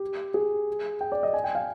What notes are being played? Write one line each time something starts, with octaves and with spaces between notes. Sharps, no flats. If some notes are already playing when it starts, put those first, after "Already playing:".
Already playing: G4
G#4
G5
D5
D#5
G#5
G5
F5